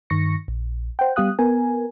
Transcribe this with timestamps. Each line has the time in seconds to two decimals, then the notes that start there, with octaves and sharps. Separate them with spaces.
0.10 G2 D#3 C#6 A#6 C#7
0.48 A#1
0.99 C5 F#5 G5
1.16 G3 B3 G4 F5 D#6 F#6
1.39 B3 A#4 G#5